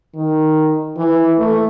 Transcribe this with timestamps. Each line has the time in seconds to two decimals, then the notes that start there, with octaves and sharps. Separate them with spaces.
0.15 D#3
0.97 E3
1.39 A3